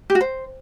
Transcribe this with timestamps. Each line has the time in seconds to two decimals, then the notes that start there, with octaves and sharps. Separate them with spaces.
0.10 G4
0.15 F#4
0.21 C5